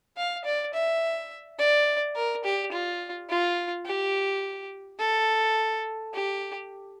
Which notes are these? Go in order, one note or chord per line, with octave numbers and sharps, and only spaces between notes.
F5
D5
E5
D5
A#4
G4
F4
F4
G4
A4
G4